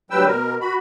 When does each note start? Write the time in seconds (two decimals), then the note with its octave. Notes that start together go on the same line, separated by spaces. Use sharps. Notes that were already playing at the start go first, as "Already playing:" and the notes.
0.11 D2 F#3 G3 B4 G5 E6
0.27 B2 A#4
0.61 F#4 B5